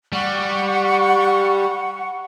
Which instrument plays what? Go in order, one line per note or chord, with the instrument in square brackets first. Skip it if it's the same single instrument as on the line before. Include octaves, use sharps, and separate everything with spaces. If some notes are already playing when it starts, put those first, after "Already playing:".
[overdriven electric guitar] G3 [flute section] F#5 C#6